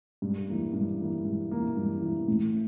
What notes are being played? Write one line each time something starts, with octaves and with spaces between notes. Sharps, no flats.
G2
E3 A#3
G2
E3 A#3
G2
E3 A#3
G2
E3 A#3
A2